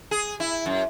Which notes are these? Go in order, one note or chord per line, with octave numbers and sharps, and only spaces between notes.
G#4
E4
F#2